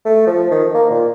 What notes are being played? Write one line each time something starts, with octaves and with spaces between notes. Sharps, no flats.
A3
F3
D#3
A#3
A#2